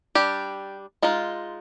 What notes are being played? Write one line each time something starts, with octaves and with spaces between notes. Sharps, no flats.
G3 D4 G4
G#3 D#4 F4